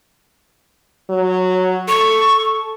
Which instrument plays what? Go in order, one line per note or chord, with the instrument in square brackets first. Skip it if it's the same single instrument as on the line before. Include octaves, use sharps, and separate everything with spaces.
[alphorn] F#3
[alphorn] A4 [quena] C#6